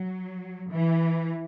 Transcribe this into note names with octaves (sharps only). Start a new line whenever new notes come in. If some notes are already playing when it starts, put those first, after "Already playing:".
Already playing: F#3
E3